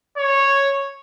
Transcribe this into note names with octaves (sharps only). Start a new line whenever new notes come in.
C#5